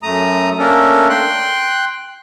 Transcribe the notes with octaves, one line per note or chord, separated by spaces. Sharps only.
F#2 A3 A#5 D#6
A3 A#3 C#4 D4 A4 A#4
G5 C6 F#6